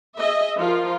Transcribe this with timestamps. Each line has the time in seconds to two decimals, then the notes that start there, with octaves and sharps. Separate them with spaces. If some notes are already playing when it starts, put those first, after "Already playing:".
0.18 G#4 D#5 E5
0.58 F3 F4 A#4